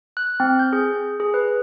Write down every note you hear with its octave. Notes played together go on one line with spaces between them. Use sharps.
F#6
C4
G6
G#4
G#4
B4